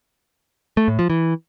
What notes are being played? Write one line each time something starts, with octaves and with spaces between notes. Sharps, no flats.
A3
A2
F3
E3